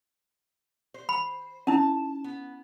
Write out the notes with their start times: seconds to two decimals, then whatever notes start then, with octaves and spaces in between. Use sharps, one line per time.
0.94 C5
1.09 B5
1.67 C#4 D#4 E4 A5
2.24 B3